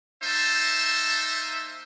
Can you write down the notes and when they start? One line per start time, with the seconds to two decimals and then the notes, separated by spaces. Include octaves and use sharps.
0.23 A#3 D#4 C5 E5 A5